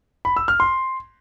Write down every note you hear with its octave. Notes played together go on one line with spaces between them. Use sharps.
B5
E6
F6
C6